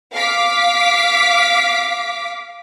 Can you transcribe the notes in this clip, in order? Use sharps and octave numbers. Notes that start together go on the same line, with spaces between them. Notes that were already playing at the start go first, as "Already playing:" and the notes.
F5 D6 B6